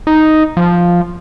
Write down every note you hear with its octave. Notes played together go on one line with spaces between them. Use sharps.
D#4
F3